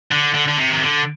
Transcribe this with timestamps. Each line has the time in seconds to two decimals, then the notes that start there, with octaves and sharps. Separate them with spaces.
0.12 D3
0.35 D3
0.48 D3
0.58 C3
0.70 D#3
0.82 D3